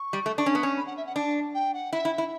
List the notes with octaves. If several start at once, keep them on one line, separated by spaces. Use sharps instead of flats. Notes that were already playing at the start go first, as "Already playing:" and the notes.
Already playing: C#6
G3
A3
D4 C#6
C#4
B3
C#4
B5
F#5
E5
F#5
D4 A5
G5
F#5
E4 E5
E4
E5
E4